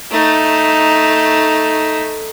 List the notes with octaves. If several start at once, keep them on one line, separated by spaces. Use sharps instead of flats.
A3 D#4